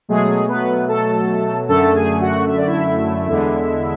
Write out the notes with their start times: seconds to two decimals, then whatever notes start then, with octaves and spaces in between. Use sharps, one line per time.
0.09 B2 F#3 G#3 A3 G#4
0.48 B3 B4
0.88 A4 A5
1.68 F#2 D3 A3 A4 A5
1.95 G#4 G#5
2.21 F#4 F#5
2.47 E5
2.57 D5
2.66 E4 E5
3.27 E2 D3 G#3